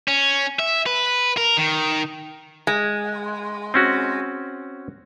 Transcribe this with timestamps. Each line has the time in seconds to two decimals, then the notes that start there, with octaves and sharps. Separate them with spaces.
0.08 C#4
0.59 E5
0.86 B4
1.37 A#4
1.57 D#3
2.67 G#3
3.74 C4 C#4 F#4